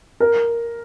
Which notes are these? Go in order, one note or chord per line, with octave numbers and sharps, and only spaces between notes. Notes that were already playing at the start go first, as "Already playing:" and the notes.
A#4